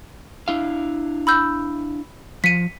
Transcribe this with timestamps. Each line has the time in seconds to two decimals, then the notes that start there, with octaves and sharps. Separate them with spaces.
0.48 D4 E4 F5
1.27 B5 E6 G6
2.44 F3 B6 C#7 D#7